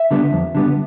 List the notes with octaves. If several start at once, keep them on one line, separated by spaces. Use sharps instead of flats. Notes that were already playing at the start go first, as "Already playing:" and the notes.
Already playing: E5
D3 G3 B3
F2
D3 G3 B3